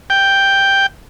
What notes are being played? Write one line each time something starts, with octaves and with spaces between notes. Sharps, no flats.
G5